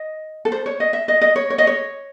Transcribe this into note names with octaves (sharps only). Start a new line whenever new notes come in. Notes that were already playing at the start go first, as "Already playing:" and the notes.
Already playing: D#5
A4
C5
C#5
D#5
E5
D#5
D#5
C#5
C#5
D#5
C#5